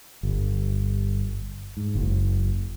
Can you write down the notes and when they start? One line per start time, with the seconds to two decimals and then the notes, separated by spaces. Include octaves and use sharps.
0.23 G1
1.77 G#2
1.95 F#1